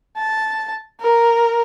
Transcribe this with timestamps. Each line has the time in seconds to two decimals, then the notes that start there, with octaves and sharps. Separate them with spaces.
0.17 A5
1.01 A#4